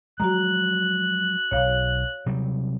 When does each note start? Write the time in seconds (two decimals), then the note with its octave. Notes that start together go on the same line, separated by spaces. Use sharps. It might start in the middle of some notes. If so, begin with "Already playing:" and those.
0.20 F3 F#3 G#3 F#4 A#5 F#6
1.51 D1 B1 C#5 F5
2.26 C3 F#3 G3